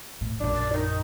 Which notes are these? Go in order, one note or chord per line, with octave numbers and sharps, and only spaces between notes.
A2
A#1 F#2 D4
D5
D#3 D#4